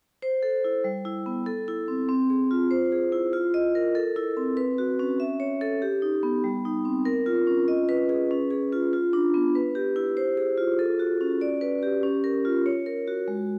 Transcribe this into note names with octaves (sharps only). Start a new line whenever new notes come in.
C5
A4
E4
G3
E4
B3
A4
E4
C4
C4
G#4
F4
C5
G#4
E4
F4
D#5
A#4
A4
E4
C4
B4
F#4
C#4
E5
C#5
A4
G4
D#4
B3
G3
D#4
C4
A#4
F4
C#4
D#5
B4
G#4
C#4
G#4
F4
F4
D4
B3
B4
G4
E4
C5
G#4
F4
A4
F#4
C#4
D5
B4
G4
C#4
A#4
F4
C#5
A#4
F#4
G#3